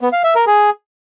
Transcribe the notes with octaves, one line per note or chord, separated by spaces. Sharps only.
B3
F5
E5
A#4
G#4